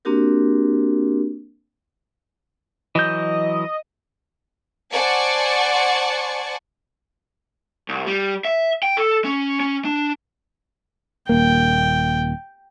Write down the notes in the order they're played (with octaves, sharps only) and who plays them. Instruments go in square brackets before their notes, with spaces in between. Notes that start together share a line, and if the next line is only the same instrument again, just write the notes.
[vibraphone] A#3 C4 D4 F#4 G4 A#4
[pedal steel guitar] E3 F#3 G6 [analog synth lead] D#5
[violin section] C5 D5 F#5 G#5 A5 C#6
[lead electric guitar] C2
G3
E5
G5
A4
C#4
C#4
D4
[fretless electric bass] D#1 A#3 [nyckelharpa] G5